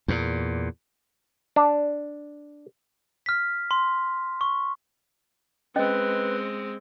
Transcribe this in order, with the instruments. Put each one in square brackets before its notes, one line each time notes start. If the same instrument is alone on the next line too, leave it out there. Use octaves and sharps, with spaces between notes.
[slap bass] E2 A#2
[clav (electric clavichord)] D4
[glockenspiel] F6 B6
C6
C#6
[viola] G#3 C4 [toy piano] C#4 D#5 [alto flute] B4